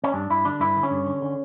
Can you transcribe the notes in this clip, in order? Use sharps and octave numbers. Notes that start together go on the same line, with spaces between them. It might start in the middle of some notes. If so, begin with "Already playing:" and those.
C#4
G2 D4
G2 E4
D3 D4
G2 E4
D3
C#4
G2
D3
D3